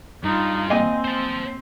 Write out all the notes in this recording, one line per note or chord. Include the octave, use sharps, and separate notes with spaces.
G2 D#4 F4
A#3 C4 D#5 G#5
C5 A5